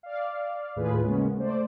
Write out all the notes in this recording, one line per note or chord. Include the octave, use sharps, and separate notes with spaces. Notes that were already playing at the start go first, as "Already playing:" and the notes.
D5 F5
D#2 A2 F4 G#4 B4
C#3 G#3 A#3 B3 C#4
A3 C5 D5